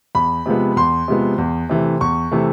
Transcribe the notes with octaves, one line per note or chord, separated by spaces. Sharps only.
E2 B5
C3 F3 G#3 B3
E2 C6
C3 F3 G#3 B3
E2
C3 E3 A3
E2 C#6
C3 E3 A3